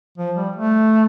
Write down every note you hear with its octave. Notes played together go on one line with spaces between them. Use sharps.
F3
G3
A3